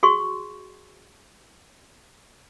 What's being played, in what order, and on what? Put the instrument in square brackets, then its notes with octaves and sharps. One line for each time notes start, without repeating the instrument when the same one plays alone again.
[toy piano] F#4 G#4 C6 C#6